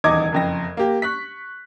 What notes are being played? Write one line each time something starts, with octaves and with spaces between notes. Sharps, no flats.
D#1 E2 D#4 D#5 D6 G#6
F#1 F2 A#6
A#3 G4
C#6 F#6 B6